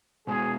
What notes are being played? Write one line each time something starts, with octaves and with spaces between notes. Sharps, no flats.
B2 G#3 B3 F#4 G#4